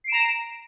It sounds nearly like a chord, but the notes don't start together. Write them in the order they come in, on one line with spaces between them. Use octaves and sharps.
C7 D7 E7 A#5